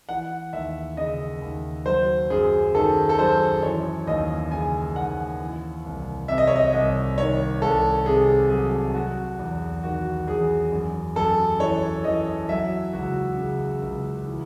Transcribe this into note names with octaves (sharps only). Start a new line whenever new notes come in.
E3 F#5
D#2 E5
C#3 D#5
D#2
F#3 C5
F#2 G#4
D#3 A4
A4
F#2 C5
E3 C#5
D#2 D#5
C#3 G#5
D#2 F#5
E3
C2
C3 E5
D#5
C#5
D#5
C2 D#5
D#3 C#5
C2 A4
C3 G#4
F#3 G#4
F#3 F#4
E2
D#3 F#4
E2 G#4
F#2
F#2 A4
E3 C#5
E3 D#5
F#3 E5
C#2 F#4
C#3
C#2
E3